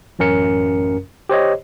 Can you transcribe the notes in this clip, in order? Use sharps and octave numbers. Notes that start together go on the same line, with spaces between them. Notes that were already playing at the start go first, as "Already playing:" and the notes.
A1 F#2 C#4 A#4 C#7
G4 C5 C#5 D#5